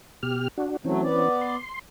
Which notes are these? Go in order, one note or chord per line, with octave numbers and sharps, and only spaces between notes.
B2 G4 F6
D4 F#4
E3 F#3 A3 C4 C#4
B3 D5
C6